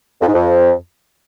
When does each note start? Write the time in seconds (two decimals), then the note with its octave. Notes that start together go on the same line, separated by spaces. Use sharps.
0.21 F2
0.27 G#2
0.34 F2